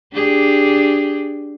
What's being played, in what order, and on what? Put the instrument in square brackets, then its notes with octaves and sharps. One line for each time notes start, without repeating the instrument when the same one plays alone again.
[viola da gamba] D4 G4 G#4